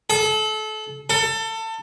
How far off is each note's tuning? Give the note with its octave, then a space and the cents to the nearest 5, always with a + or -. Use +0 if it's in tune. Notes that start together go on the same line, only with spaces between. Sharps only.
A4 -30
A4 +25